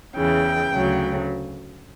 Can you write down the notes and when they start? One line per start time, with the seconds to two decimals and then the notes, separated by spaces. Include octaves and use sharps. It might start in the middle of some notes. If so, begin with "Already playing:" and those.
0.15 E2 C#3 E3 G5
0.72 D2 C#3 F#3